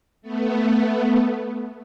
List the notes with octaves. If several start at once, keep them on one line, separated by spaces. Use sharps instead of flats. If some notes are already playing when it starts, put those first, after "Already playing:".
A3 B3